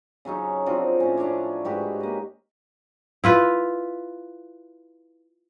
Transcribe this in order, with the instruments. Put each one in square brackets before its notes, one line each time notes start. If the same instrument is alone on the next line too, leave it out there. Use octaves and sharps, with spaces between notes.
[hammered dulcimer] C#3 F#3 C#4 D#4
F3 C4 D4 F#4
A2 C#4
C#4 D4 C#5 D5
G#2 F#4 G4 B4
A#3 D#5
[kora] E4 F4 B4